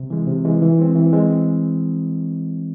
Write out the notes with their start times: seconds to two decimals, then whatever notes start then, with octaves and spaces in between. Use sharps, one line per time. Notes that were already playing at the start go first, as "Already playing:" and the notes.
Already playing: C3
0.10 E3 G#3
0.27 C3
0.45 E3 G#3
0.62 E3
0.79 G#3 C4
0.96 E3
1.13 G#3 C4